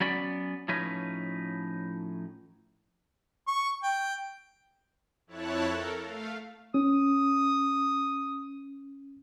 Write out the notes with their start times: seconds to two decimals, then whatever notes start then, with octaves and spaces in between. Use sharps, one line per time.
0.01 F#3 B3 C#4 D5 B5
0.68 A2 F3 C#4 D#4 B4
3.48 C#6
3.83 G5
5.27 F2 E4 C#5 A5 F#6
5.66 A4 A#4
6.02 A3 F5
6.74 C#4 D#6